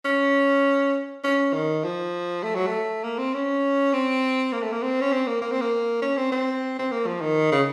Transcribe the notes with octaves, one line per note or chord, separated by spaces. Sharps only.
C#4
C#4
D#3
F3
A3
F#3
A3
A#3
C4
C#4
C4
A#3
A3
A#3
C4
C#4
C4
A#3
A#3
C4
A#3
C#4
C4
C4
C4
A#3
F3
D#3
C#3